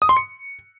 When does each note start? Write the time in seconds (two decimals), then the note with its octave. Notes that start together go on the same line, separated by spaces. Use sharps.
0.02 D#6
0.09 C6
0.17 C#7